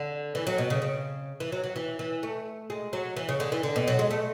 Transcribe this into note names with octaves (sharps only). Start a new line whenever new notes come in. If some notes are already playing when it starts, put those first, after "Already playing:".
Already playing: D3
E3
F#3
B2
C#3
C#3
E3
F#3
F#3
E3
E3
A3
G#3
F#3
E3
C#3
D3
E3
D3
B2
F#3
G#3
A3